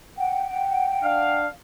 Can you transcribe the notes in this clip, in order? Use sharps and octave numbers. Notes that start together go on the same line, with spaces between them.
F#5 G5
D4 F5